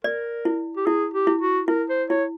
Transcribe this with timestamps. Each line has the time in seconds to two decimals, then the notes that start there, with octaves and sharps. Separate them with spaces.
0.04 A#4 D5
0.45 E4
0.77 G4
0.86 E4 G#4
1.14 G4
1.27 E4
1.41 F#4
1.68 E4 A#4
1.89 C5
2.09 E4 C#5